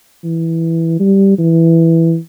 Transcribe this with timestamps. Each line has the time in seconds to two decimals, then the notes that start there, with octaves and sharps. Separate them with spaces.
0.24 E3
1.00 G3
1.39 E3